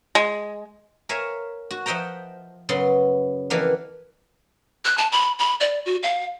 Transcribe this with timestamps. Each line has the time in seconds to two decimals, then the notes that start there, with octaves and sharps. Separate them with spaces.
0.15 G#3
1.09 A#4 C#5 E5 F5 G#5
1.71 F#4
1.86 F3 D#5 E5 F#5 G5 A#5
2.69 F#2 C#3 B3 C6
3.50 F2 E3 A#3 B4 F5 F#5
4.85 F#6
4.98 A5
5.12 B5
5.39 B5
5.60 D5
5.86 F#4
6.03 F5